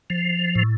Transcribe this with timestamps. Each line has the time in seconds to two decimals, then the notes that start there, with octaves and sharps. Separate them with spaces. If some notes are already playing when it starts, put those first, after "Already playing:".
0.10 F3
0.55 A2